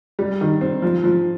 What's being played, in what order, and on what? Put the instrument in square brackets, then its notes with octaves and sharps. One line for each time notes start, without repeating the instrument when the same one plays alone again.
[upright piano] G3
D#3
C4
F3
F3